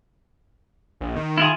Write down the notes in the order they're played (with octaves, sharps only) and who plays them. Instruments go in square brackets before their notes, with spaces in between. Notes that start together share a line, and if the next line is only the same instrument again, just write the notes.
[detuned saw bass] A#1
D#3
[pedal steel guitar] E4 F4 G#4